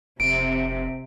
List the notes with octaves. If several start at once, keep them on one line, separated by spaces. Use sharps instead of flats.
F1 C3 D7